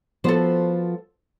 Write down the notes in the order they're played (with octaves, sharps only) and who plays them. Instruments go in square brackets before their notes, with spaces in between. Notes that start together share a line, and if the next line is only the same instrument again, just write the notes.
[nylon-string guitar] F3 B3 F#4 [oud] A4 C5